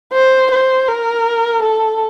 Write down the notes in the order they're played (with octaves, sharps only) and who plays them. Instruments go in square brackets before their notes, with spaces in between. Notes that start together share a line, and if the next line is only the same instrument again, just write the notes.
[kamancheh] C5
C5
A#4
A4